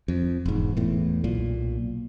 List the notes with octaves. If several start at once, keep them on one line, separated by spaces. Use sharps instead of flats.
F2
E1 G#2
E2 A2
B1 A#2